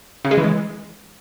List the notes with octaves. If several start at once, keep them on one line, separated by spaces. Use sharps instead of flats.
C#3
G#3
E3
G#3